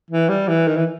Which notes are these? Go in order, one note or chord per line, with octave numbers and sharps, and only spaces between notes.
E3
G3
E3
D#3
E3